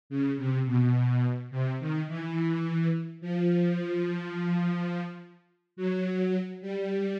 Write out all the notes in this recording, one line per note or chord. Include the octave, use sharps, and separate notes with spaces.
C#3
C3
B2
C3
D#3
E3
F3
F#3
G3